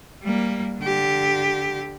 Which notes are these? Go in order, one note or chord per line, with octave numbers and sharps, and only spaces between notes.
G3 A#3
D3 G4